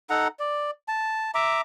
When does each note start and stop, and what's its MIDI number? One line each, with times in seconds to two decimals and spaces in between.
0.10 0.28 63
0.10 0.28 69
0.10 0.28 78
0.10 0.28 82
0.39 0.71 74
0.88 1.31 81
1.34 1.61 76
1.34 1.61 82
1.34 1.61 86